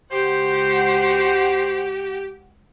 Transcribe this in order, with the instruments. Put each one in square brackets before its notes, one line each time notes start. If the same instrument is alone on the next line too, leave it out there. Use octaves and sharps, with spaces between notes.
[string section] C#2 F#4 F#5 [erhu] G4 [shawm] C5